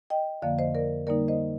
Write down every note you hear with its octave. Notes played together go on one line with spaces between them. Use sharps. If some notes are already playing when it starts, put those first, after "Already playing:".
D#5 G5
F2 D3 F3 A#3 D5 F5
C5 D#5
A#4 D5
D3 G3 A#3 D#4 A#4 D5
C5 D#5